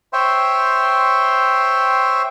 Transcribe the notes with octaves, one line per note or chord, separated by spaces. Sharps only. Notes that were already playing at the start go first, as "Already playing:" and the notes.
C5 C#5 E5 G5 C6